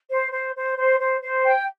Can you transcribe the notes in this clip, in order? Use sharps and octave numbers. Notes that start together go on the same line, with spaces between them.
C5
C5
C5
C5
C5
C5
G5